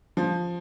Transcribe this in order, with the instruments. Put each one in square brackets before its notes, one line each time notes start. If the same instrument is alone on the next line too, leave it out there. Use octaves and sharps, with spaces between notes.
[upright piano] F3